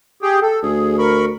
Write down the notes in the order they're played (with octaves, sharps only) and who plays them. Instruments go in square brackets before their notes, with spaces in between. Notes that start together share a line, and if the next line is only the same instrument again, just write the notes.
[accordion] G4 G#4 G5
A4
[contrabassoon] D2 [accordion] G#4
[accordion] A#4 B5 C#6